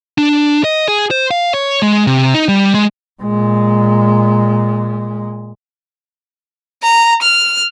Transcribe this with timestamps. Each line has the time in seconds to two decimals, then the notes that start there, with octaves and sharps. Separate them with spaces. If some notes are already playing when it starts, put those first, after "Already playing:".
0.18 D4
0.64 D#5
0.88 G#4
1.11 C5
1.31 F5
1.54 C#5
1.82 G#3
2.07 C3
2.34 D#4
2.48 G3
2.74 G#3
3.22 A#2 G#3
6.83 A#5
7.22 F6